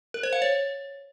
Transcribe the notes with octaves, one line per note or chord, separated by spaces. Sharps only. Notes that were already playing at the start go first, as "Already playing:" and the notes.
A#4
C5
F5
C#5